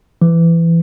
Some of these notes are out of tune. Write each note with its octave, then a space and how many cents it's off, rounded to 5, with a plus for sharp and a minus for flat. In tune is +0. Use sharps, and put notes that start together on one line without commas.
E3 +20